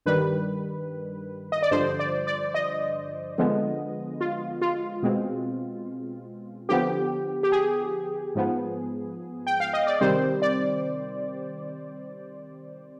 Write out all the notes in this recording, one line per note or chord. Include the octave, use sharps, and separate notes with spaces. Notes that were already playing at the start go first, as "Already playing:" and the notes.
G2 D#3 G3 B4
D#5
D5
G2 D3 F3 C5
D5
D5
D#5
D3 F3 G#3 B3
F4
F4
B2 G#3 C4
D3 F3 B3 G4
G4
G#4
G#2 F3 B3
G5
F5
D#5
D5
C3 D#3 G3 C4 C5
D5